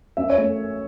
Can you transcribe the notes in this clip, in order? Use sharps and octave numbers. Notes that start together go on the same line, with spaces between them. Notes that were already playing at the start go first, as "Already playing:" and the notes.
F#2 E5
C#5
A3